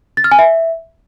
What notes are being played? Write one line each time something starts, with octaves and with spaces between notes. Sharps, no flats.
A6
F6
G#5
E5